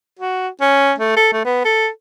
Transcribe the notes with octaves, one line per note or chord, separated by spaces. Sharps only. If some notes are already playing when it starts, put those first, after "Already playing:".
F#4
C#4
A3
A4
A3
B3
A4